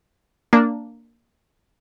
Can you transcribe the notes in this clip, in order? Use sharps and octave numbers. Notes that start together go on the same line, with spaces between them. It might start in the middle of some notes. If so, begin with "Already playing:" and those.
A#3 D4